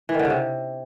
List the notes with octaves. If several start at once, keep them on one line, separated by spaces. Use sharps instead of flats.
E3
D#3
D3
C#3
C3